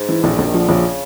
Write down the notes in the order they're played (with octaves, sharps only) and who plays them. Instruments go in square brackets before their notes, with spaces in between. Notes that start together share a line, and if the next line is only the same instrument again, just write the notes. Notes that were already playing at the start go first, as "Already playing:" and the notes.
Already playing: [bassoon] G#2
[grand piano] E3
[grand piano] A#1 [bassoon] A2
[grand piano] A#1 [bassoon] A2
[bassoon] D#3
[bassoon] D3 [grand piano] F3
[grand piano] A#1 [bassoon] C#3